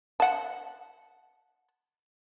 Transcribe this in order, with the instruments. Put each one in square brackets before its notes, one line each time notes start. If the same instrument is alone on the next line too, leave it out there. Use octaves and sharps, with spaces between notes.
[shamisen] F#5 A5